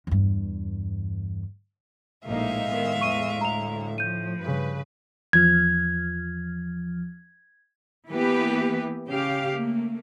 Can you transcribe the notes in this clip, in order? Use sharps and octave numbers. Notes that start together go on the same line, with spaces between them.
E2 G2
A#1 A2 G#3 A#3 D#4 E5 F5
A2 D#3 B3
E2 C#6 D#7
D2 A#5 F7
F3 G6 D#7
G2 C#3 B4
E2 F3 F6 G#6
E3 A#3 B3 G4 B4
C#3 G4 F5
A3 A#3